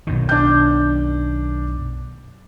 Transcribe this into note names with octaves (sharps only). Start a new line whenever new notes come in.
B1 F#2 D#3
D4 G6